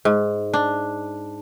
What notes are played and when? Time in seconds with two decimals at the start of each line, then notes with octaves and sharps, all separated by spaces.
0.05 G#2
0.54 D4